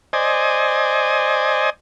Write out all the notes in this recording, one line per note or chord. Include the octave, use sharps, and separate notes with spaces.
C5 D5 D#5 G#5